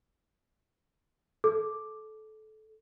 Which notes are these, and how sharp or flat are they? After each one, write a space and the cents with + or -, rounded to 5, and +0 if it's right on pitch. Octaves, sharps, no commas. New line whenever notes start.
A4 -20